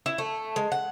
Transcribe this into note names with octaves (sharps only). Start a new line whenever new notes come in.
E4
A3
G#3
F#5